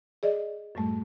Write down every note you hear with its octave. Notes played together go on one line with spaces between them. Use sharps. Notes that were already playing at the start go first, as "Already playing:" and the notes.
G#4 D5 D#5
F#2 A2 G3 A3